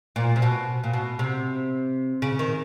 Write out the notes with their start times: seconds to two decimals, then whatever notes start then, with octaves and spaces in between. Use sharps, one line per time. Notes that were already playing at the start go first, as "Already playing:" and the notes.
0.16 A#2
0.36 C3
0.42 B2
0.84 A#2
0.93 B2
1.19 C3
2.22 C#3
2.39 D#3